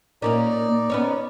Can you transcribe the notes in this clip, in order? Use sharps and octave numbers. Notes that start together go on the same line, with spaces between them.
A#2 A#3 C#4 D#4 D5
B3 C#4 C#5